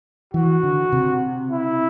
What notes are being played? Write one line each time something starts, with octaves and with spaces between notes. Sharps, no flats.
E3 F#4
D3
C3
E4